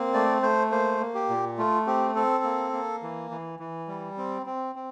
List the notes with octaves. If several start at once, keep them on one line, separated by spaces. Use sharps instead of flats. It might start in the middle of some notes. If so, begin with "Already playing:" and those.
Already playing: A#3 C4
A3 D5
A3 C5
A#3 C5
A#3
G4
A#2
A3 F4
C4 G4
C4 A4
A#3
A#3
E3
E3
E3
G3
C4
C4
C4